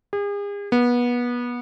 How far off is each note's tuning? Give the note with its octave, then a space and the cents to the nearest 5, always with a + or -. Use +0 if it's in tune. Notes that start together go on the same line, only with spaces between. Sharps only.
G#4 -40
B3 -25